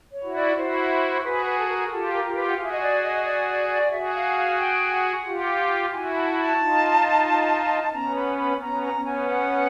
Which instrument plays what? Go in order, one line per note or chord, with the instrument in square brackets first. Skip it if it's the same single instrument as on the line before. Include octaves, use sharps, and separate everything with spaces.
[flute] C#5
[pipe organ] E4 F#4
[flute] D5
[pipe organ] E4 F#4 [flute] C5
[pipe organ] F#4 G#4 [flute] B4
[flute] B4
A4
A#4
[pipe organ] F4 G4 [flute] A4
[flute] A#4
[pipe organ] F4 G4
[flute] B4
F#5
[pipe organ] F#4 G#4 [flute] F5
[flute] E5
D#5
D5
D#5
D5
D5
D5
[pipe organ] F#4 G#4 [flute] E5
[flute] F5
F5
G5
F#5
[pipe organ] F4 G4
[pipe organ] E4 F#4 [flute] G#5
[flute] A5
A5
[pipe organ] D#4 F4
[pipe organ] B3 C#4 [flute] A#5
[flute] B5
B5
[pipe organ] B3 C#4 [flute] A#5
[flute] A#5
[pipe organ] B3 C#4
[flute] G#5
F#5